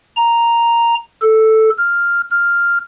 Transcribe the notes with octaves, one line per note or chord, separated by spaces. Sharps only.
A#5
A4
F6
F6